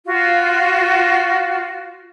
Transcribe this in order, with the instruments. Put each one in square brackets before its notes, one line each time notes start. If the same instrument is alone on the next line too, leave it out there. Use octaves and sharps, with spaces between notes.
[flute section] F4 F#4